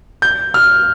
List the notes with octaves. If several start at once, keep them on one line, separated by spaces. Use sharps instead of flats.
G6
F6